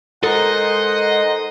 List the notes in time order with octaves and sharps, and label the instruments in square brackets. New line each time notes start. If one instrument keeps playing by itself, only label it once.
[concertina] G#3 D#4 C5 [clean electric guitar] A4 A#4 [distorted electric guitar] D#5 [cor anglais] F#5